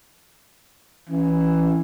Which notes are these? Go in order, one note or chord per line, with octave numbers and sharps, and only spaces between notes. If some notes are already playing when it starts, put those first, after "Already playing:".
E3 C#4